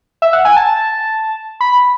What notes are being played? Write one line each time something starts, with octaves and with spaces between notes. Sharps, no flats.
E5
F#5
G#5
A5
B5